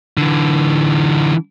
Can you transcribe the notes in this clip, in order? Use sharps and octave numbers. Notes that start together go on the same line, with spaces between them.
D3 E3